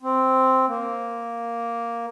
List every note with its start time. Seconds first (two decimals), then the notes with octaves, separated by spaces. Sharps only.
0.02 C4
0.68 A#3